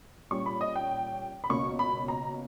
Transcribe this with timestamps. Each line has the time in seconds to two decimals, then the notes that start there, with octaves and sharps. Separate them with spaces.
0.31 A#2 G3 C#4 C#6
0.46 B5
0.61 D#5
0.76 G5
1.44 B5
1.49 C#2 B2 A#3 C#4 C#6
1.79 B5
2.08 A#5